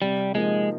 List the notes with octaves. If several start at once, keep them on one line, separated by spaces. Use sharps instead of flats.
C3 G3
F3 G#3 A#3 D#4